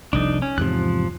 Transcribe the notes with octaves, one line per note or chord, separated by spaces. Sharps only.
F1 C2 F2 D4 D#4
C#4
E2 G#2 C3 F3 F#6